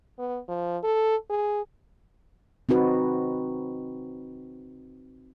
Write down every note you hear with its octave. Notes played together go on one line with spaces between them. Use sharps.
B3
F3
A4
G#4
C4 D#4 F#4 B4